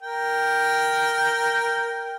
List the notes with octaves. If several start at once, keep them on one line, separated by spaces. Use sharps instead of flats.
A#4 G5